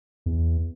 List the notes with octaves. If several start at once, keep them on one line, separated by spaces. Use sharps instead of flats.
E2